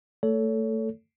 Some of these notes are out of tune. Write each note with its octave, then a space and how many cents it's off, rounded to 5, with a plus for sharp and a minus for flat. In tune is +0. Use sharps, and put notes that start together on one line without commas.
A3 +25 A4 +0 C#5 +30